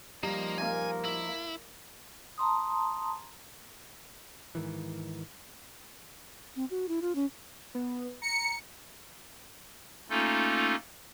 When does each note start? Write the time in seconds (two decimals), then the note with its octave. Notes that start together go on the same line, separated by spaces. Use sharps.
0.23 F3 G3 A#3 D#4
0.58 A#3 G#5
1.05 E4
2.38 A5 A#5 C6 D#6
4.55 G#2 D#3 E3
6.56 C4
6.70 F#4
6.88 E4
7.02 F4
7.15 C#4
7.75 B3
8.22 A#5 C#7
10.10 A3 A#3 C#4 D#4 F4 A4